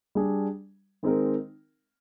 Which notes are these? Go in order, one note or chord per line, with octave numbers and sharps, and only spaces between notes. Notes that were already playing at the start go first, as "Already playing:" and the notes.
G3 D4 G#4
D#3 G#3 C4 D#4 A#4